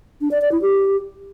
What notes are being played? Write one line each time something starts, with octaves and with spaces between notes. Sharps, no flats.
D4
D5
D5
E4
G4